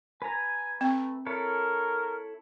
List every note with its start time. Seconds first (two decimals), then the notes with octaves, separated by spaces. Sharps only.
0.22 B4 G#5 A#5
0.81 A3 C4
1.26 E4 A4 A#4 C#5